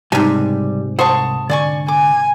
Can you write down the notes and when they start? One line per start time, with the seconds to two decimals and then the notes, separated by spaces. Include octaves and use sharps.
0.12 C#2 G#2 C3 G3 A5
0.99 C2 C5 F#5 A5 C6 C#6 D#6
1.50 D3 D5 G#5 C#6
1.88 G#5 D6